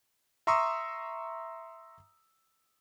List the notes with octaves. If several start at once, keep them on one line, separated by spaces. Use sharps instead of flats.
E5 A#5 C6 C#6 D#6 E6